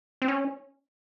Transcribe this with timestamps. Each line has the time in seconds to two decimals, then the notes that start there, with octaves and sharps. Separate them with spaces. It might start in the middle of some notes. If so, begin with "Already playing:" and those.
0.22 C4
0.28 C#4